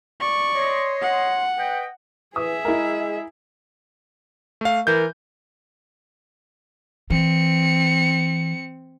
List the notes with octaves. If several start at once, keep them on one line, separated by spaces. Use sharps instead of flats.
D5 C#6
C#5 D#5 C6
F#5
B4 D#5 G5
E3 G#4 E5 D#6
G#3 E4 A#4
A3 F5
E3 A#4 G6
E3 C4 C#7